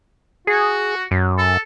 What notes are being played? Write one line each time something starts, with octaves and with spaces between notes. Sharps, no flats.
F#4 G#4
F#2
A4